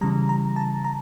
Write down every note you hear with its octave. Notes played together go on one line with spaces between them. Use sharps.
C#3 E3 G3 A#5
A#5
A5
A#5